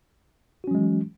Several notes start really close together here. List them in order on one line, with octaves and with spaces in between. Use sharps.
F#4 C#4 F#3 G#3 E3